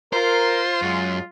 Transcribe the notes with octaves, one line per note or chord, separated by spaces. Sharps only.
F4 A#4 C5
F#2 F#3 G#3